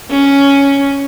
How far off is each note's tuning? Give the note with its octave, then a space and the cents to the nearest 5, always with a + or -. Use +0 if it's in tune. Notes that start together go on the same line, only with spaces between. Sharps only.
C#4 +5